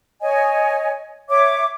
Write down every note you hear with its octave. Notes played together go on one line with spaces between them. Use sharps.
C#5 D#5 G#5
C#5 E5 D6